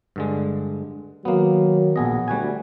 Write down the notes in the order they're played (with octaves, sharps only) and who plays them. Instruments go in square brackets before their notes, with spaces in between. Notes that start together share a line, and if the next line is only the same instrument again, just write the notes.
[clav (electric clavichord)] G2 D3 G#3
[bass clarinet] D#3 [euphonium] F#3 [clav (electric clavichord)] A#3 B3
[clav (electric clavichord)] A#1 G#4 D#5 [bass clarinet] B3
[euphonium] D2 [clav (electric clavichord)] G3 F#4 G#5